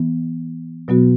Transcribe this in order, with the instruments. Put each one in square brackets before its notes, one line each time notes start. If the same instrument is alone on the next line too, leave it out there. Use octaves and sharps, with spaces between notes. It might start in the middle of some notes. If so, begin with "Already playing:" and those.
Already playing: [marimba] E3 B3
B2 F#3 B3 F#4